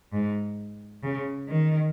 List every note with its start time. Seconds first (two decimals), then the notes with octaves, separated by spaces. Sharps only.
0.13 G#2
1.03 C#3
1.48 D#3